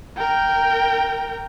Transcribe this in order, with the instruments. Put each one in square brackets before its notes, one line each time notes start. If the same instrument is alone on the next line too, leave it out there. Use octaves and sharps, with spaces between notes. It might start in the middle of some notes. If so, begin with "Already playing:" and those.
[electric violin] A#4 G5